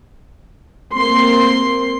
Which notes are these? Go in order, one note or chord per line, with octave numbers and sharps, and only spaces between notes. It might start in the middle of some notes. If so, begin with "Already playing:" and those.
A#3 C4 C6